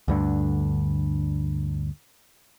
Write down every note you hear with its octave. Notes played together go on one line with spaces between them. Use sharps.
D2 G2 D3